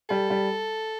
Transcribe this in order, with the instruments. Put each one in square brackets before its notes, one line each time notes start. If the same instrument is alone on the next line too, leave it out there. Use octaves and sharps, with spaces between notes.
[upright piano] G3 [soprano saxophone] A4
[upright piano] G3